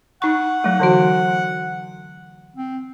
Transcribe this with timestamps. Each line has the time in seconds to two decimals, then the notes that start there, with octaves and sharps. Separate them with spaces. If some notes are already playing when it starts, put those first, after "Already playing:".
0.22 D#4 F#5 C#6
0.64 F#3 A3
0.80 D3 E3 F#4
2.56 C4